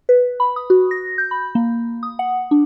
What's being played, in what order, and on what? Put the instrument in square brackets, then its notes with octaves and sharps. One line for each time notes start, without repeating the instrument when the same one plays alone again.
[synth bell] B4
B5
D#6
F#4
A#6
G6
B5
A#3
D#6
F#5
D4